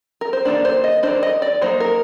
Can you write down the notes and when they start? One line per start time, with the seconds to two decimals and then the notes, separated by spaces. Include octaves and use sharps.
0.21 A#4
0.33 C5
0.45 D#3 F#3 A#3 D4 D5
0.65 C5
0.84 D#5
1.03 D#3 A3 D4 C5
1.23 D#5
1.42 D5
1.61 F#3 A#3 D#4 C5
1.80 A#4